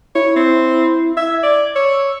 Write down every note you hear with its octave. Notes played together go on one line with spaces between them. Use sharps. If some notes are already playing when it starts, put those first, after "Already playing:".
E4 C#5
C4
E5 G#6
D5
C#5 E6